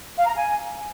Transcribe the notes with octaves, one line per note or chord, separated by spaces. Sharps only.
F5
A#5
G#5